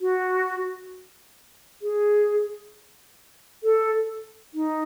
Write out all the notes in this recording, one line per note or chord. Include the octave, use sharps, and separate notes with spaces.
F#4
G#4
A4
D#4